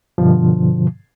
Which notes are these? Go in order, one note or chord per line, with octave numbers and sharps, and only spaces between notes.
G2 B2 D3 F3